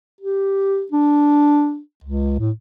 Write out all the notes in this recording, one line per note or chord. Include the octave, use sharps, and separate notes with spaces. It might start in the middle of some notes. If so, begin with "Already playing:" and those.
G4
D4
C#2
A2